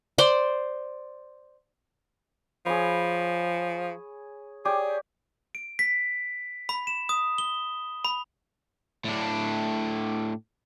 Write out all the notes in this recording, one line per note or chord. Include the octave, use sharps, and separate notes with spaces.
C5 D5 C6
F3 G#4 C#5 B5
G4 G#4 C#5 D5
D7
B6
B5
E7
D#6
G7
B5
A2 D4